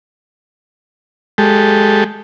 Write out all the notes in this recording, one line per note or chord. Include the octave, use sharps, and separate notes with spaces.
G#3 G4 A4